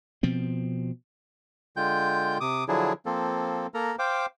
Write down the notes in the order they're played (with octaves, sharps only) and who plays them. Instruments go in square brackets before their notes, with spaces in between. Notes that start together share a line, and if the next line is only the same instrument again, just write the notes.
[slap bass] B2 F3 C4
[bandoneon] D3 G#3 F4 G5 G6
C3 D6 D#6
D3 F3 F#3 D4 E4 G#4
F3 A#3 C4 A4
A#3 A4 A#4 A#5
C5 F5 G5 D6